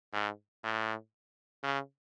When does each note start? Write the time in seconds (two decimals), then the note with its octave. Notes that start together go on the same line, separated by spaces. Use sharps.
0.13 G#2
0.64 A2
1.63 C#3